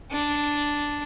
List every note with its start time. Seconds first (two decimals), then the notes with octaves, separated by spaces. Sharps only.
0.12 D4